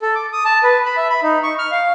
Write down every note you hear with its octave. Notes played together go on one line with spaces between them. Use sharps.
A4
D6
D#6
A5
B4
B5
E5
B5
D#4
C#6
F6
F5